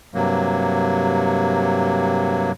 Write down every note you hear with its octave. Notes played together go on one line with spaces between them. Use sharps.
G2 C3 F#3 A#3